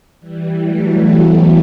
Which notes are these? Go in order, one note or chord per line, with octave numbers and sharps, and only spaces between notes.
E3 G3
F#3 A3
G3 B3